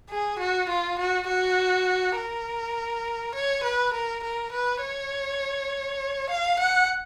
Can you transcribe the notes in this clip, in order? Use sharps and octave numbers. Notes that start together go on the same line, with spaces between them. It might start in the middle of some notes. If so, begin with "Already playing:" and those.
G#4
F#4
F4
F#4
F#4
A#4
C#5
B4
A#4
A#4
B4
C#5
F5
F#5